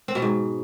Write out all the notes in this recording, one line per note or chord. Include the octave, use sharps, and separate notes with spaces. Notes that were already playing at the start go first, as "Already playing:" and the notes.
C4
B2
G#2